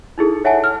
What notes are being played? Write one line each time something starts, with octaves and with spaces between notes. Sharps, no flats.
D#4 E4 G#4 A4
C#5 E5 F#5 G#5 A5
F6